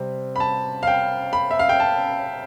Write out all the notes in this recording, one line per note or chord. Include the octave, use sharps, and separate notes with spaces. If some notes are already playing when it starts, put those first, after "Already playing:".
Already playing: C3 G3 C4
B5
A5
F5
G5
B5
E5
F5
G5
A5